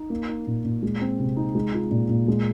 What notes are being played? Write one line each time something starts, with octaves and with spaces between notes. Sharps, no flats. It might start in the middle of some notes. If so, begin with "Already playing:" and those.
Already playing: D#4
A#3
D#4
A#2
A#2
G#3
C4
C3
D#4
G#3
F4
A#2
A#2
G#3